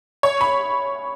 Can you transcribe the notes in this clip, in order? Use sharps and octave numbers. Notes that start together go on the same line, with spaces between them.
C#5
B5